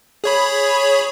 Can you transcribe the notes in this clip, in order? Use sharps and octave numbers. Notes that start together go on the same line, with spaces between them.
G#4 C#5 B5